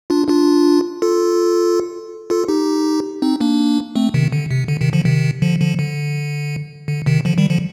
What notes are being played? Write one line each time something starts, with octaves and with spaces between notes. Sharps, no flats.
D4 F4
D4 F4
F4 A4
F4 A4
D#4 G4
C4 D#4
A#3 D4
A3 C4
C3 D#3
D3
C3
D3
C3 D#3
D3 F3
C3 D#3
D3 F3
D3 F3
D3
D3
C3 D#3
D3 F3
D#3 G3
D3 F3